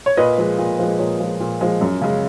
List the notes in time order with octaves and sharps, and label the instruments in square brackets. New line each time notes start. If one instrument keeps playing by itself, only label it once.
[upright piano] C#5
A#2 B4 D#5
F3 G#3
A#2
F3 G#3
A#2 A#4 C#5
F3 G#3
A#2
F3 G#3
F#2
C#3 G#3